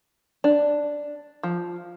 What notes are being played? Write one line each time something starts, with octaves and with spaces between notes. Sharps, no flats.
D4
F3